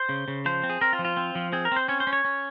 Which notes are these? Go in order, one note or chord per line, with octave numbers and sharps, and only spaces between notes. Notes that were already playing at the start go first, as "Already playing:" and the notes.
Already playing: C5
C#3
C#3
F3 C5
C4
G#4
C4 A#4
F4
F3
F4
C4
F3
C4 G#4
A#4
C4 C5
C#4 C#5
C5
C#4
C#5
C#4